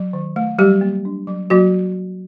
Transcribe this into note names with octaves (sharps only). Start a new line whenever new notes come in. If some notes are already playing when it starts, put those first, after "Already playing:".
Already playing: F#3
D#3
A3
F#3 G3 G4
A#3
D4
F#3
F#3 A#3 F#4